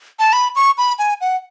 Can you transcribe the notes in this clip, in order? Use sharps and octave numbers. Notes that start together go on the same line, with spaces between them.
A5
B5
C#6
B5
G#5
F#5